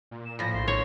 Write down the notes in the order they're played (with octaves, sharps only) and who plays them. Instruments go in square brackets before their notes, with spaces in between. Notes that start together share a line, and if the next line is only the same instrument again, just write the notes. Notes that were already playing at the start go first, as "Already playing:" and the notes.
[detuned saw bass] A#2
[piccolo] E7
[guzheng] A2 F3 [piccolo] A#6
[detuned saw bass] A#1 [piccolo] C6
[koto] C#5